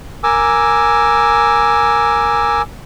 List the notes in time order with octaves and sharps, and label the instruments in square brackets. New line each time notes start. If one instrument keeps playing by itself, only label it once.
[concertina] A#4 G#5 D6 E6